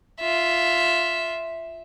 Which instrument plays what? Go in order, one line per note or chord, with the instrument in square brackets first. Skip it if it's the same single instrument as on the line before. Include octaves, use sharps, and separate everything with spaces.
[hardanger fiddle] F4 E5